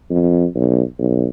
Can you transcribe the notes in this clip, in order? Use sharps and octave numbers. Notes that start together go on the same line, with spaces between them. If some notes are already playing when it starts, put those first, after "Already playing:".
F2
B1
B1